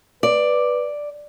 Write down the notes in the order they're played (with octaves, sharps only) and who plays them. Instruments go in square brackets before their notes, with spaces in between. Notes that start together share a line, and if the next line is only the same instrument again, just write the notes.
[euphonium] B4 [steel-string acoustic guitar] D5